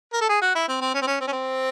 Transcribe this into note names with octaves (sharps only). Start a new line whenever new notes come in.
A#4
A4
G#4
F#4
E4
C4
C4
C#4
C4
C#4
C4
C#4
C4